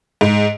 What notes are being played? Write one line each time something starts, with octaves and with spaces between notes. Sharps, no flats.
G#2